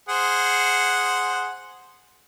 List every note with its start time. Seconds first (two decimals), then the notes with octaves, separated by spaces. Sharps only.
0.09 G#4 C5 F#5